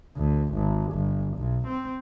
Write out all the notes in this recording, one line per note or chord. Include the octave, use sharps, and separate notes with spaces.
D2
G#1
G1
B1
C4